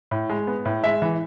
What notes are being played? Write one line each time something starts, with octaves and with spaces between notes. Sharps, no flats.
A2
G#3
B3
A2
G#3 E5
E3